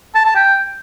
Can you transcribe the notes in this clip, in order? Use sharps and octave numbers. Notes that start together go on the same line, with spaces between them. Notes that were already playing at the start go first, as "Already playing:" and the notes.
A5
A5
G5